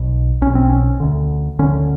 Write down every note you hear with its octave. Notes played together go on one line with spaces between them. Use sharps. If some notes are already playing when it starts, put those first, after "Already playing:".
Already playing: B1 B2
B1 B2 C#4
C4
C#4
D2 D3
D2 D3 C#4